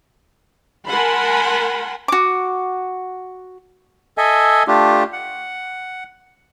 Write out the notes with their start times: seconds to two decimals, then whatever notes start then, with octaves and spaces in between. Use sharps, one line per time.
0.89 A#4 F#5 G#5 A5 B5 C6
2.08 F#4 D6
4.18 A4 D#5 E5 G#5
4.68 A3 D4 F4 G4
5.13 F#5